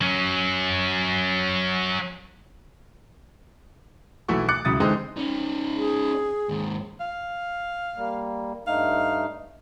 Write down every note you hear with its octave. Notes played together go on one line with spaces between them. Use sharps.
F#3 C#4
B1 E3 A3 E4 F#4 C#6
D6 F#6 A6 C#7
C#2 F#2 E4 D#6 A6
D3 E3 G#3 C4 D#4 A4
C#4 D#4
G#4
D#2 G#2
F5
G3 A#3
G2 A3 D#4 F5